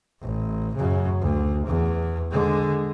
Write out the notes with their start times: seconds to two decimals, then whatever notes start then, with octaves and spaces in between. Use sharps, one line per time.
0.21 A1
0.75 F#2 C#3
1.21 D2
1.67 E2
2.31 D3 G#3